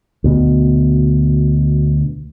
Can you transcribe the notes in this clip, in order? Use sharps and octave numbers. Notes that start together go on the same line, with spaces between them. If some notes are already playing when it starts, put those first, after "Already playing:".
D2 B2